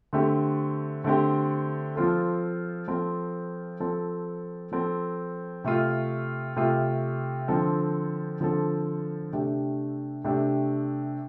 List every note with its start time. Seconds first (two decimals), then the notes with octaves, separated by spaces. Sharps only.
0.13 D3 A3 C4 G4
1.04 D3 A3 C4 G4
1.96 F3 C4 F4 A4
2.88 F3 C4 F4 A4
3.80 F3 C4 A4
4.72 F3 C4 A4
5.64 C3 A3 F4
6.56 C3 A3 F4
7.48 D3 F3 C4 A4
8.40 D3 F3 C4 A4
9.33 C3 A3 D4 G4
10.24 C3 A3 D4 G4